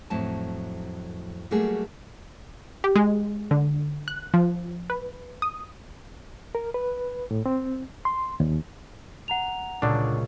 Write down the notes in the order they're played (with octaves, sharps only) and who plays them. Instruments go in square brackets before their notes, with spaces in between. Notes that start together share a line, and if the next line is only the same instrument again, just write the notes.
[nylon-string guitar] F2 A2 F#3 A5
F#3 G3 A3 A#3 F#4 G#4
[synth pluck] G4
G#3
D3
F#6
F3
B4
D#6
[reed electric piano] A#4
B4
A2
C4
C6
D#2
[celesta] F#5 A#5 F7
[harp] C#2 A#2 [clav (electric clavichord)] D3 D4 [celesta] C#6